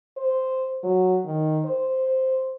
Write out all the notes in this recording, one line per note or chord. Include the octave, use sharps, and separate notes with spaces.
C5
F#3
D#3
C5